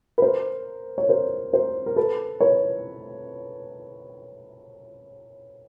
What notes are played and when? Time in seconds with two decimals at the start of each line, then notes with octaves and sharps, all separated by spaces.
0.18 B4
0.22 A#4 C5
0.98 C#5
1.09 A#4 C5
1.53 A#4 C5
1.86 A#4
1.96 A4 B4
2.41 B4 C#5